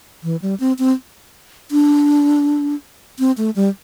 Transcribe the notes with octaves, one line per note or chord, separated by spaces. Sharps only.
E3
G3
C4
C4
D4
C4
A3
G3